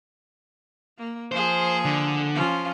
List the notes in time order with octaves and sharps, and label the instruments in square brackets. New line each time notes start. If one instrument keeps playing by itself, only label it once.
[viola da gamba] A#3
[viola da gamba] F3 A#3 G#4 [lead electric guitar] C5
[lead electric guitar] D3
[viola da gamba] F3 C#4 F4